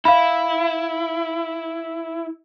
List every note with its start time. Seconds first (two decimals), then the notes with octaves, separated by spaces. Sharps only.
0.05 E4 F5 B5